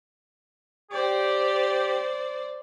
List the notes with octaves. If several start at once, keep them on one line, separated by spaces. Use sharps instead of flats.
G4 C5 D5